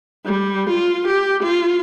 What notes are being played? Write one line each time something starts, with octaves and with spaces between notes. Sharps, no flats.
G3
F4
G4
F4